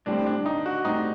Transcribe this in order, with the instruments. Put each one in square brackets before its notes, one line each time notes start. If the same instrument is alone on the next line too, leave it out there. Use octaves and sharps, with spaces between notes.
[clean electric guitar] A2 G3 C4 [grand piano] D4
[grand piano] D4
D#4
F#4
[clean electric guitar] A2 G3 C4 [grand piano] D#4